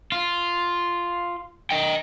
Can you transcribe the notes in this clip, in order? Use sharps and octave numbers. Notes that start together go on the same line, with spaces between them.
F4
D#5 G5